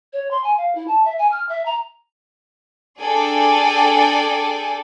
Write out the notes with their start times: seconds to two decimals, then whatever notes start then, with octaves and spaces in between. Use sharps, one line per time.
0.13 C#5
0.31 C6
0.44 G#5
0.57 F5
0.75 E4
0.88 A5
1.05 E5
1.19 G#5
1.32 F6
1.49 E5
1.66 A#5
2.99 D4 G#4 A4 D5 G5 G#5